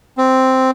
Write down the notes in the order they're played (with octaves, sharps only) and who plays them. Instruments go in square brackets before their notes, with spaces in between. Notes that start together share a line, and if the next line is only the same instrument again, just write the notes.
[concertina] C4